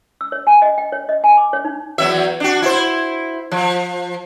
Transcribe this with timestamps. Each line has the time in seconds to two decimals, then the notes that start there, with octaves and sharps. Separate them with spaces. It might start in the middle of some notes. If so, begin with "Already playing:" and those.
0.21 E6
0.32 C#5
0.47 G#5
0.62 D#5
0.78 G5
0.92 C#5
1.09 D#5
1.24 G#5
1.37 D6
1.53 C#5
1.65 D#4
1.98 E2 F#3 E5
2.40 D4 F#4
2.62 E4 C5
3.51 F3